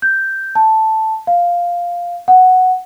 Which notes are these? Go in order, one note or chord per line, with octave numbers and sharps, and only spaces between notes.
G6
A5
F5
F#5